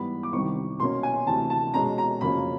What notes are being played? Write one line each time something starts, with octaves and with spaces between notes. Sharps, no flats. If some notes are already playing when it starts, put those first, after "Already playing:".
Already playing: G#2 E3 G3 B3 B5
D6
C2 C3 D#3 G3 C4 C#6
B2 F#3 A#3 C#4 C6
G#5
D2 C3 E3 A5
A5
B2 G#3 C#4 A#5
A#5
F2 C#3 F#3 A#3 C#4 B5